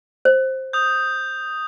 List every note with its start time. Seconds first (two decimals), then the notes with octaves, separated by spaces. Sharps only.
0.25 C5
0.73 D#6 G6